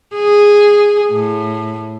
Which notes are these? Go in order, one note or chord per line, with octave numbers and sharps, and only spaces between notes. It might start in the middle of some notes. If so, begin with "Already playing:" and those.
G#4
A2